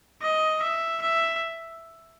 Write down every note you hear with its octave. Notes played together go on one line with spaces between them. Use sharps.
D#5
E5
E5